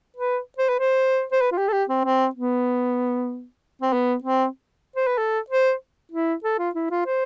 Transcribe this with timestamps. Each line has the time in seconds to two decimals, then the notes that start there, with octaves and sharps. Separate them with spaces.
0.17 B4
0.58 C5
0.69 B4
0.79 C5
1.32 C5
1.41 B4
1.52 F4
1.58 G4
1.68 A4
1.73 G4
1.89 C4
2.05 C4
2.35 B3
3.82 C4
3.93 B3
4.24 C4
4.96 C5
5.07 B4
5.18 A4
5.50 C5
6.12 E4
6.44 A4
6.59 F4
6.75 E4
6.91 F4
7.06 C5